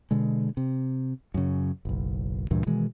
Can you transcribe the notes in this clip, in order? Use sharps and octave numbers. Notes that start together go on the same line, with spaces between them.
B2 D3 G#3
C3
F#2 C#3
F#1 B1
D2 G2 A#2 E3
B2 D#3 E3 G#3